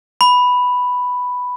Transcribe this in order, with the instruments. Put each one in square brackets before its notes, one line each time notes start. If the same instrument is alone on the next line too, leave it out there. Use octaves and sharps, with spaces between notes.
[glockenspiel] B5